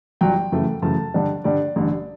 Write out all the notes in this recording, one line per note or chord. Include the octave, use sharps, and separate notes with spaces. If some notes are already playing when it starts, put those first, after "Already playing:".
G1 G2 F#3 G5
F#2 C#3 E3 A3
F#2 C#3 E3 A3 A5
G2 D3 G3 D4
G2 D3 G3 D4 D5
A1 G2 D3